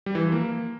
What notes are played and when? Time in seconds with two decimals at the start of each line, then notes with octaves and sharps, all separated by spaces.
0.06 G3
0.15 E3
0.24 F3
0.32 A#3